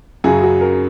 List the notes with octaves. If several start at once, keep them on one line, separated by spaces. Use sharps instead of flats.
F#2 C#3 F#3 G#4
F#4
A#4